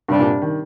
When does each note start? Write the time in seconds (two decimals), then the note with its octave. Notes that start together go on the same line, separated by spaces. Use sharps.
0.08 G2 C3 G3 D4
0.20 A#2
0.42 D#3